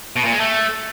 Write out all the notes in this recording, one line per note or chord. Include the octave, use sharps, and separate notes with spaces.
B2
A#2
G#3
A3